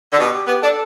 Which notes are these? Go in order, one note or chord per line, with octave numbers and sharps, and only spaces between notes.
D3
B2 G4
G4
B3 G4
D4 A4